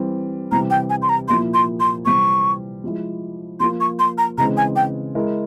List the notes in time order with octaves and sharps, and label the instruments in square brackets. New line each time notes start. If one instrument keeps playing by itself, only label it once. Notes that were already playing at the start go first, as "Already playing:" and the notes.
Already playing: [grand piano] E3 G3 C4
[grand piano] C3 E3 G3 C4 [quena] A#5
[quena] G5
G#5
C6
A#5
[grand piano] A#2 F3 A#3 E4 [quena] C6
[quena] C6
C6
[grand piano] C3 E3 G3 C4 [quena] C#6
[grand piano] F3 G#3 E4
[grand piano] F3 [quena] C6
[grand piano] A#3 F4
[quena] C#6
C6
A#5
[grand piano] C#3 E3 G#3 C4 [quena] A#5
[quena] G#5
G5
[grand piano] G#3 E4 A#4